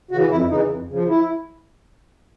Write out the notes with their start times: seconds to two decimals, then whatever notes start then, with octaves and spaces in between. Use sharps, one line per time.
0.11 C#3 E3 F#4
0.31 F2 E4
0.50 C#3 E3 D#4
0.70 F2
0.89 C#3 F3
1.09 E4